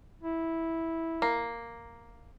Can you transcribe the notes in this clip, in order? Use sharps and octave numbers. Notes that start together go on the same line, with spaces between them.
E4
A#3